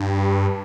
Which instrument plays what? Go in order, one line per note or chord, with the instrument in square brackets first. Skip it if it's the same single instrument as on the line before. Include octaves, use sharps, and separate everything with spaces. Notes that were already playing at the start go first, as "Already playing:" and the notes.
Already playing: [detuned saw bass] G2